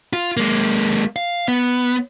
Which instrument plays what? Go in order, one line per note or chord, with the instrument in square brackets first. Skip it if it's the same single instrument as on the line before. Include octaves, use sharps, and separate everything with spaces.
[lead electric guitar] F4
G#3 A#3
F5
B3